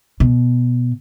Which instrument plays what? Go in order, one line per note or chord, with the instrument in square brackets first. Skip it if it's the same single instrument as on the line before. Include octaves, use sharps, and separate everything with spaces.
[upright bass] B2